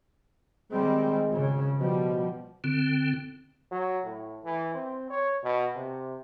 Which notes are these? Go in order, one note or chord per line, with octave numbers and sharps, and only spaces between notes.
D#3 G3 G#3 C4
G#1 C#3
B2 F3 G3
D3 C4
F#3
A2
E3
C4
C#5
B2
C3